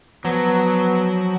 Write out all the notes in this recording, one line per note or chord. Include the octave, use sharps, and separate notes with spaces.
F3 F#3 B3